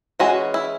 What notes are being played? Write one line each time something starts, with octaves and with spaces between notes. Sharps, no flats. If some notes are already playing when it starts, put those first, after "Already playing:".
E3 G#3 C#4 F#4
E4